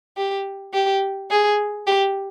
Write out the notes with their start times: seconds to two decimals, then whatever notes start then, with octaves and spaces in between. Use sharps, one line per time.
0.17 G4
0.73 G4
1.30 G#4
1.87 G4